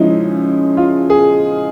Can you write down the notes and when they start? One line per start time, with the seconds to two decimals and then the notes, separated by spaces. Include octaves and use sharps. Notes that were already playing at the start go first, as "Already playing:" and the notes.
Already playing: C#3 F3 G#3 C#4 D#4 E4
0.77 F4
1.10 G#4